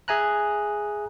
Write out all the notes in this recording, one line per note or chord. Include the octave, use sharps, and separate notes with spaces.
G#4 E5 G#5 A#5 F#6